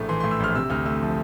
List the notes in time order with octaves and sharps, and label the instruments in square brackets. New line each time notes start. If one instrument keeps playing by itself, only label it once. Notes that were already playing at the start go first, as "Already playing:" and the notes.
Already playing: [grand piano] A#1 A2 A3
E3 C6
A2 C6
E6
A#1 F6
C3 E6
D2 F6
A3 E6
F3